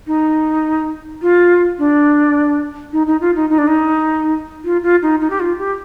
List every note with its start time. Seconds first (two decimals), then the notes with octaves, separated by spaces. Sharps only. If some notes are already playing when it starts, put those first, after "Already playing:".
0.07 D#4
1.22 F4
1.79 D4
2.93 D#4
3.07 D#4
3.21 F4
3.36 D#4
3.50 D#4
3.58 D4
3.67 D#4
4.64 F4
4.83 F4
5.02 D#4
5.21 D#4
5.30 G4
5.40 F4
5.59 G4